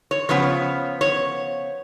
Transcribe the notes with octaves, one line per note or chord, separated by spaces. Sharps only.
C#5
C#3 F3 B3 C#5
C#5